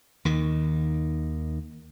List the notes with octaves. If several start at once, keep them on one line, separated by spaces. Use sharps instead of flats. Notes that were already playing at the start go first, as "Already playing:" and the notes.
D#2 D#3